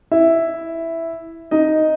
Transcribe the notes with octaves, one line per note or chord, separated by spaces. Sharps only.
E4 E5
D#4 D#5